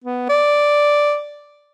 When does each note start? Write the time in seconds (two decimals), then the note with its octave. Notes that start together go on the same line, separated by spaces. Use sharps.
0.04 B3
0.29 D5